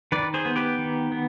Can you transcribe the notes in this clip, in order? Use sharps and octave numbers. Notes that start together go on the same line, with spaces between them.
D#3 B4 D5
G#4 C5
B3
G4 B4
D#3
B3